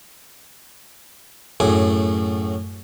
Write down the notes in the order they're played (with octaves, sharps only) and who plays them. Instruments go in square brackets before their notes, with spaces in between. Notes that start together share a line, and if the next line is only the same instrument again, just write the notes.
[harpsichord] F#2 A2 G#4 D6